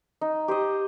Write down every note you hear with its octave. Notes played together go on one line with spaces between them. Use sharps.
D#4
G4 C5 D#5